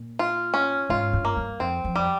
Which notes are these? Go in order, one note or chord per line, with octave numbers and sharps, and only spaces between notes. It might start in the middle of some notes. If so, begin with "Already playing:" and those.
Already playing: A#2
F4
C#4
G#2 F4
G2
A#3
G2
F2 C4
F2
G3